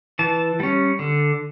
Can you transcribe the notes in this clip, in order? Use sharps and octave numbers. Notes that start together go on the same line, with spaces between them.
E3 A5
G3 C#4
D3